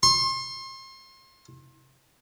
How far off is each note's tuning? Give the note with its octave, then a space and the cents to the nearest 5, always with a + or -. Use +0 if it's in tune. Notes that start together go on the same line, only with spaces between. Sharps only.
C6 +35